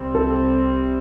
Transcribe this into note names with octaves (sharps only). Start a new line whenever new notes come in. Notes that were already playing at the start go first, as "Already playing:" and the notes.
Already playing: C2 C3 G3 C4
A4